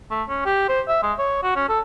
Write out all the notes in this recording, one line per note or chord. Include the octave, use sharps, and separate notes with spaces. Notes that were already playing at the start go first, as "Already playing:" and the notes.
A3
C#4
G4
C5
E5
G#3
C#5
F#4
C#4
A4